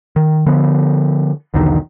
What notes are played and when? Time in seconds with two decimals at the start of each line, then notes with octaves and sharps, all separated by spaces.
0.16 D#3
0.46 D3 F3 B3
1.54 B1 E2 D3 D#3